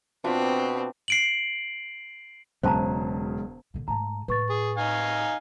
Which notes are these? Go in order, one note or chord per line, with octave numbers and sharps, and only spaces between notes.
B2 C4 D4 F4 B4
C7 D7 F#7
E1 C#3 F#3 G#3 C5 A5 A#5
A#2 D3
G#2 A3 A5 A#5
A2 B4 C#6 A6
G#4
D#4 F5 G#5